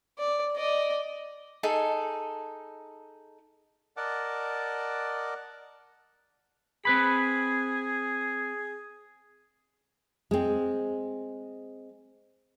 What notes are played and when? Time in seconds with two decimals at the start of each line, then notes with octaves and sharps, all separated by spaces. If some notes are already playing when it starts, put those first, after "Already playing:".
0.18 D5
0.56 D5 D#5
1.63 D#4 G#4 A4
3.97 A#4 D5 D#5 F#5 A5 D6
6.85 C4 G#4 B4 B5
10.31 G#3 C4